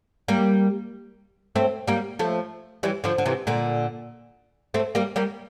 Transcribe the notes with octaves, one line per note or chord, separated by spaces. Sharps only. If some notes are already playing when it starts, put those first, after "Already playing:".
G3 A#3
A3 C4
G3 A#3
F3 A3
E3 G3
D3 F3
D3
C3 E3
A#2 D3
A3 C4
G3 A#3
G3 A#3